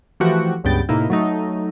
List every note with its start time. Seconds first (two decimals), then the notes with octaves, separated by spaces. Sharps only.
0.20 E3 F3 A3 F#4 G4
0.64 C#2 G2 B3 G5 A6
0.89 A2 C3 A#3 D#4 E4
1.10 F#3 A3 D#4